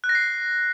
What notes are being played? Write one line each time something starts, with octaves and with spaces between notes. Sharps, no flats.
F#6
A#6
C7